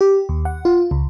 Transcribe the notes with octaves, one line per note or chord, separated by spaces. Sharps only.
G4
D#2
F#5
F4
C#2